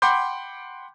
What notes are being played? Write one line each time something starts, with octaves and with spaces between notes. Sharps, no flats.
F#5 G5 B5 C6 D6 G6